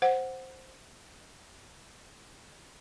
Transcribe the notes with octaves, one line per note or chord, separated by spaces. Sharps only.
C5 F#5